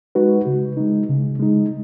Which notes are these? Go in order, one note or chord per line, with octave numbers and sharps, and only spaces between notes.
G#3 D#4 F#4 B4
C#3
G#3 D#4
C#3
G#3 D#4